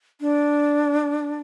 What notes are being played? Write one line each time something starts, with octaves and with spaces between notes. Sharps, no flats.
D4